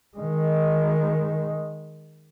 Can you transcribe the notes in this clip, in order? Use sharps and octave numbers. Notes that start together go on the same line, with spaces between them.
D#3 G#3